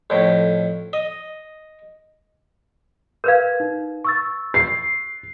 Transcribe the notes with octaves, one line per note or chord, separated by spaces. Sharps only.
F2 A2
D#5
A#4 B4 F5 G6 G#6
D#4
C#6 E6 A6
C7